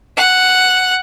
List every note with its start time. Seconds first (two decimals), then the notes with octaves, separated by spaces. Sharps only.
0.17 F#5